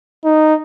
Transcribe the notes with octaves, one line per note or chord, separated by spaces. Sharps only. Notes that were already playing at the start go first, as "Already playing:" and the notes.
D#4